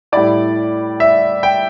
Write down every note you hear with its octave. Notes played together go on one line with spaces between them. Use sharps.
A2 G3 E4 D5
E5
G5